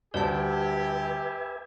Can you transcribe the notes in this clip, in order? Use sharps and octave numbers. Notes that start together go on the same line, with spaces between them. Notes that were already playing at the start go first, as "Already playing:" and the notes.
D2 G3 G4 B4 D5 E5 G#5 A5